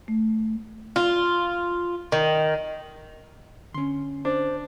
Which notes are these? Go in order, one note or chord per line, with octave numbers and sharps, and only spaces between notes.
A3
F4
D#3
D3 C#4 C6
D4 C5